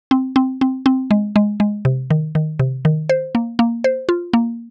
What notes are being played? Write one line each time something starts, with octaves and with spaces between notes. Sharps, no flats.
C4
C4
C4
C4
G#3
G#3
G#3
C3
D#3
D#3
C3
D#3
C5
A#3
A#3
C5
F4
A#3